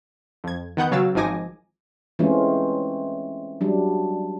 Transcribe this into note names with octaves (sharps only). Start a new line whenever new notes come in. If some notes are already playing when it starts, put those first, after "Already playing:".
F2 G#6
D#3 B3 F#5 G6
C#3 F#3 C#5 F5 E6 A6
G#1 F3 D#4 G#5 D6 A#6
E3 G#3 A3 C4 C#4 F4
F#3 G3 D4